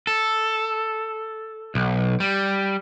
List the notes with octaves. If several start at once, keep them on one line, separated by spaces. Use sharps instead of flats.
A4
B1
G3